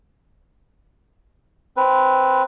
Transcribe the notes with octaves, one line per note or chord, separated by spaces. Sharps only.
C4 B4